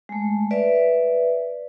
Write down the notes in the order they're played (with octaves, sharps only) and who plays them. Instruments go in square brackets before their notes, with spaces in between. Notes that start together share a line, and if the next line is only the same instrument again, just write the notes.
[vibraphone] G#3 A3
B4 D5 E5